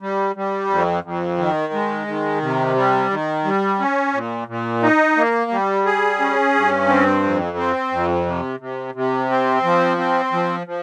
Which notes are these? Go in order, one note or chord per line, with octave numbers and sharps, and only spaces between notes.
G3
G3
F2
F2
D#3
G#3
D#3
C3
G3
D#3
G3
C#4
A#2
A#2
D#4
A#3
G3
G#4
C#4
G2
C4
F2
C4
F2
C3
C3
C3
C4
F3
C4
F3
F3